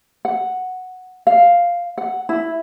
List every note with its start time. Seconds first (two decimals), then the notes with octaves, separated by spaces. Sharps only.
0.25 F#5
1.27 F5
1.98 F#5
2.29 E4